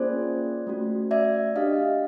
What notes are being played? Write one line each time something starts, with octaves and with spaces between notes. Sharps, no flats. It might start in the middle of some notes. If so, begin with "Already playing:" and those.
Already playing: A#3 C#4 F4 G#4 C5 D5
A3 C#4 F#4
D5 E5
D4 G4 D#5 F5